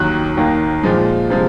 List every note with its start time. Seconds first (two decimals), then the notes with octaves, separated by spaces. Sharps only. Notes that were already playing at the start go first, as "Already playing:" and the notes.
Already playing: D#2 D#3 F#3 F#6
0.37 D#2 D#3 A#3
0.83 A#2 F3 G#3
1.30 C3 F3 G#3